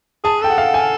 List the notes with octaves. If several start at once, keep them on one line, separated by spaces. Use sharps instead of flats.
G#4 A5
A4 G5
F#5
F5
G#5